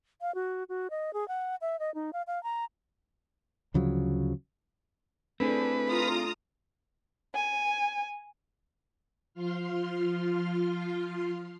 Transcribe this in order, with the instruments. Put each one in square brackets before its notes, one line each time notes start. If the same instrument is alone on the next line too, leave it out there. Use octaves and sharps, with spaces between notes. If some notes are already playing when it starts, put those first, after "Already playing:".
[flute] F5
F#4
F#4
D#5
G#4
F#5
E5
D#5
D#4
F5
F5
A#5
[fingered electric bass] D2 C#3 F3 F#3
[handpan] A3 D4 [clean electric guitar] C4 E4 G#4 [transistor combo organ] B4
[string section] F4 A#5 D#6
[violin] G#5
[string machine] F3 F4 C6 F6